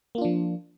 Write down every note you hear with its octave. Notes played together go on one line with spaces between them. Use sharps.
F3 A#3 D4 F4